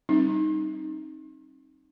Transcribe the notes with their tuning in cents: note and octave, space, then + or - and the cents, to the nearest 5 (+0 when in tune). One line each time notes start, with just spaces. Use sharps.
G3 +0 C4 +35 D#4 +0